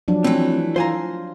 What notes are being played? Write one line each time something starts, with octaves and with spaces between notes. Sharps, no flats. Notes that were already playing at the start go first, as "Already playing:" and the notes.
F3 F#3 D4
E3 A3 C4
F4 C5 G#5 A#5